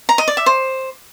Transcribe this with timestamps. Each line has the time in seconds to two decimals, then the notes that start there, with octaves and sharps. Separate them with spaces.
0.09 A#5
0.18 D#5
0.28 D5
0.37 E5
0.46 C5